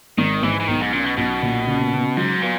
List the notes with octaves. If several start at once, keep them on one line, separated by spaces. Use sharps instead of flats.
G#1 D#3
G#2 E3
E3
B1 D#3
G#2
A#2 C#4
B2
B1 B2
A#2
C#3
C#3
G#2 F#3
A#2 B3